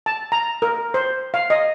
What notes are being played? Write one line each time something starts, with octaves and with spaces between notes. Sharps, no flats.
A5
A#5
A#4
C5
F5
D#5